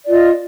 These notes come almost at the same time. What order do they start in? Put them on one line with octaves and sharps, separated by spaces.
D5 F4 D#5